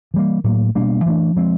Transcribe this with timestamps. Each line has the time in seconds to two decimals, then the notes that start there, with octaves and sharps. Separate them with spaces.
0.14 E3 G3 A#3
0.44 A2 F#3 A#3
0.75 B2 G3 A#3 D4
1.06 E3 A3 D4
1.36 F3 G#3 C4